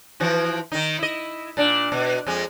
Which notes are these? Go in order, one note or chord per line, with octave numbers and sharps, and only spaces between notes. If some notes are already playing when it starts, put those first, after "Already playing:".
E3 F3 F#4
D#3 D#4
E4 D#5
A#2 D4
B2
F2 G#3